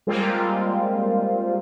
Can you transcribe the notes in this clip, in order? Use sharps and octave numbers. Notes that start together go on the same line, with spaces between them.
G3 G#3 A#3 C4 F4